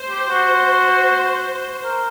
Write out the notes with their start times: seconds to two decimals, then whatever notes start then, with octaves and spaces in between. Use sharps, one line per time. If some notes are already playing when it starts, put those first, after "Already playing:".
Already playing: C5
0.10 G4
0.29 F#4
1.84 A#4